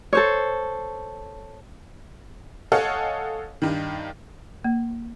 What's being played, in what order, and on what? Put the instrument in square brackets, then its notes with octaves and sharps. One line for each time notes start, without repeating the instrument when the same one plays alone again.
[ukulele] A4 C5 C#5
[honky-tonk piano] A4 C#5 D#5 F5 F#5 G#5
G2 D#3
[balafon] A#3